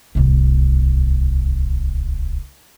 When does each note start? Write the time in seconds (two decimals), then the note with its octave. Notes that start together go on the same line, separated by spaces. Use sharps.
0.15 D1 C2